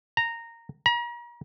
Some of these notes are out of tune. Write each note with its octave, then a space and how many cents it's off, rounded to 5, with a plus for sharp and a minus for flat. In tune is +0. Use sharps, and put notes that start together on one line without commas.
A#5 -10
A#5 +40